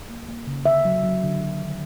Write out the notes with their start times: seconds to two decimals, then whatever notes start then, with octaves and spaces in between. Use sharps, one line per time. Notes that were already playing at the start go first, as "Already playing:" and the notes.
0.10 A#3
0.29 A#3
0.47 C#3
0.66 D3 E5
0.85 F#3
1.04 F#3
1.23 D3
1.41 F#3
1.60 D#3